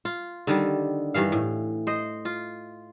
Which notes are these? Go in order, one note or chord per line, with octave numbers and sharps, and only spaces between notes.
F4
D3 D#3 G3
G2 D#3 E3 F5
A2
C5 D#5
F4